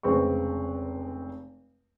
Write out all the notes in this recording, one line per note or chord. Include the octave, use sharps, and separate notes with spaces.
F1 C#3 G#3 C4 B4 C#6